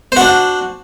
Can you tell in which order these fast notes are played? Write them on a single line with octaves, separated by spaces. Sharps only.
C5 F#4 D4